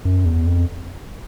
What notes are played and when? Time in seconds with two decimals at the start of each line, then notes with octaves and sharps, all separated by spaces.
0.05 F#2
0.25 E2
0.47 F2